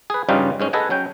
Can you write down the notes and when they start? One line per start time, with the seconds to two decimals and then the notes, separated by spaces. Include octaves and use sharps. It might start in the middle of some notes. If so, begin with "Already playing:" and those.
0.10 G#4 B4
0.29 G2 C#3 G3 C#4 D#4 F4
0.60 G#2 G#3 C#4
0.73 G#4 A4 B4 D#5 F#5 G#5
0.90 F#3 C#4 G5